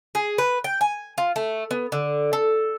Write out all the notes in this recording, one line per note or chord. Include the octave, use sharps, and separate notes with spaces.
G#4
B4
G5
G#5
F4
A3
B3
D3
A4